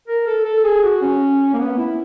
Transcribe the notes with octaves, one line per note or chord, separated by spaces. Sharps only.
A#4
A4
A4
G#4
F#4
C#4
A#3
B3
E4